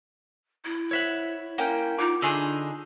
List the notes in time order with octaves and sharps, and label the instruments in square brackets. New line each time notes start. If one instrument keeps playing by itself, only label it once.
[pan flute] E4
[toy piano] A#4 C5 [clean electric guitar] C#5 E5 F#5
[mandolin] A#3 C#4 G5
[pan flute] D#4 [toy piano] F4 F#5 [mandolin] D6
[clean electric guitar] D3 [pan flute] D4 [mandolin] D#4 G#4 [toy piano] G4 E5 E6